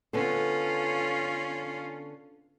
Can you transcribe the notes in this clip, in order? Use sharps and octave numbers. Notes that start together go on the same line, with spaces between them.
D3 B3 C#4 F4 A4